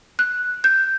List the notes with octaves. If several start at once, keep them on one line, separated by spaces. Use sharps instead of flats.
F#6
G6